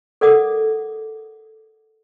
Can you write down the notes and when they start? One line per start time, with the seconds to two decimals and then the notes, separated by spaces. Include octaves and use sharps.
0.21 A4 A#4 D5 F#5 D6 D#6